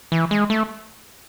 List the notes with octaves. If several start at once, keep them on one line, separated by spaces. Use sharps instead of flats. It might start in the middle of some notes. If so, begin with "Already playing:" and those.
E3
G#3
A3